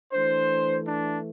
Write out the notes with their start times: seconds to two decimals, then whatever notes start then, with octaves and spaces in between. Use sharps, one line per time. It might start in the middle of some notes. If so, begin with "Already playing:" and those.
0.13 E3 A3 D4 C5
0.85 D4